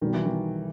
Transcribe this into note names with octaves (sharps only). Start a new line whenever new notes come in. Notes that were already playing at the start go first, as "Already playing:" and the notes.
B1 B2 D#3 G3
E3
D#3